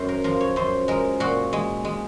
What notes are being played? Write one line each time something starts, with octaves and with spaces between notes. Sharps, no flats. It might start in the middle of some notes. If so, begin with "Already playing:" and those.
Already playing: F#2 C5
A#4
F3 A#4
C#5
F#2 C5
G#3 A#4
A#2 F#4
G#3
G#3